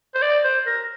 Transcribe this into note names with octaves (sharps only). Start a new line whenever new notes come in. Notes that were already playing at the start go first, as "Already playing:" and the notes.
C5
D5
C5
A#4